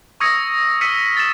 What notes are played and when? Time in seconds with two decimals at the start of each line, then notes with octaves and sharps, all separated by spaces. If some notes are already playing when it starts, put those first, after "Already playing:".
0.20 C#6 D#6 E6 G#6 A#6 C#7
0.81 E6 F6 B6 C#7 D#7
1.17 A6 E7